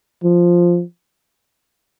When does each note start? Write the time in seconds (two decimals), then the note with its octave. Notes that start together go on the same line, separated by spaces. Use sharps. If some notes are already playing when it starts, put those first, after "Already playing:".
0.24 F3